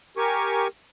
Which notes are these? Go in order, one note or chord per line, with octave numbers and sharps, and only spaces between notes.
G4 A#4 G#5 C#6